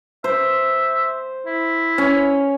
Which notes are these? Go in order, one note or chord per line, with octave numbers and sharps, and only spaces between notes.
C5 E5
E4
C#4